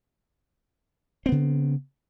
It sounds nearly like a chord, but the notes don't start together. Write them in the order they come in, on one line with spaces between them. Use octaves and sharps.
C4 B3 C#3